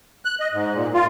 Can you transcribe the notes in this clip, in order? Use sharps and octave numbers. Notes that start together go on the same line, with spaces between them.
F#6
D#5
G#2
A#2
F4